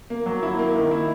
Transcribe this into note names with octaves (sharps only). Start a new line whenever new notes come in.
A#3
F#3
E4
A#3
D#3
E4